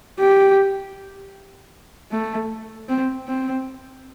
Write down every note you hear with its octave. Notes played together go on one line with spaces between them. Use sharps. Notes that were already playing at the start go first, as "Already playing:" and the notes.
G4
A3
C4
C4